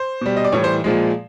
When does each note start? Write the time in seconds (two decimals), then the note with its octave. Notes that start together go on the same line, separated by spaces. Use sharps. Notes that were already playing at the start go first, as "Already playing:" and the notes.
Already playing: C5
0.21 B2 G3
0.36 D#5
0.45 D5
0.52 A2 E3 G3 C#5
0.64 C5
0.84 A#2 F3 G#3